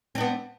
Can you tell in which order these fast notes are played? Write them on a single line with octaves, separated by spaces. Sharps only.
C4 D4 B3